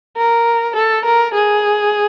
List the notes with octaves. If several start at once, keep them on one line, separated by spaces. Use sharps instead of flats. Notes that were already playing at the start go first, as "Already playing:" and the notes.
A#4
A4
A#4
G#4